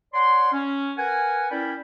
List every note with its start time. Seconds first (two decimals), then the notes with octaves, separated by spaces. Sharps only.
0.14 C#5 D5 F#5 C6
0.52 C#4
0.97 A#4 B4 F#5 G#5
1.51 C#4 E4 A#4 D5 G5 B5